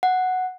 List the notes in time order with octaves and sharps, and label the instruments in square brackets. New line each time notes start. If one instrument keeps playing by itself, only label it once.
[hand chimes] F#5